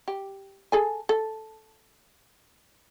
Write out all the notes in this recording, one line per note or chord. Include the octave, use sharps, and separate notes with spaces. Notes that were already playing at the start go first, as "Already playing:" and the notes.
G4
G#4 A4 G#5
A4